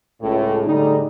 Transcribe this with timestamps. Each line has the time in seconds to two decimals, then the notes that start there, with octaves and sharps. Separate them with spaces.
0.21 C#2 A2
0.65 A2 D3 G3 G#3 D#4